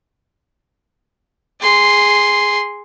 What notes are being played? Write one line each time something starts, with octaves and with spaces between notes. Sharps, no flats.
G#4 C6